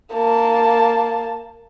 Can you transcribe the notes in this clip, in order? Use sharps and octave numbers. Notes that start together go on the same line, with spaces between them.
A#3 A5